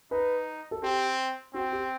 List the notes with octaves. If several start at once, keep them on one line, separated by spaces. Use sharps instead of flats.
D#4 B4
A4
C4 G4
C4 F#4
G4